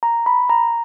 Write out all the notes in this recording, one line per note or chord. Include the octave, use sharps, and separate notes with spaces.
A#5
B5
A#5